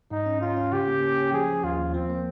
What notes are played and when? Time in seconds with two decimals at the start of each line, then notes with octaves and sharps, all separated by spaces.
0.11 G#2 D#4
0.26 C#4
0.41 C#4 F4
0.57 C#4
0.72 C#3 G4
0.88 A#3
1.03 C#4
1.18 C#4
1.33 F3 G#4
1.49 F3
1.64 D#2 F4
1.79 D#2
1.94 F3 C4
2.10 A#3